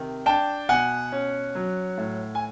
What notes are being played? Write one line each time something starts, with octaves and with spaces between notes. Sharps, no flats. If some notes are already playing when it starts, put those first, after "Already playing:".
Already playing: C3 D#3
D4 G5 A5
B2 F#5 G#5
C#4
F#3
A2
G#5